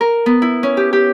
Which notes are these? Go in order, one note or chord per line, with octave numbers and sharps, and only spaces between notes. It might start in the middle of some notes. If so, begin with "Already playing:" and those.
A#4
B3
E4
C#4
G4
G4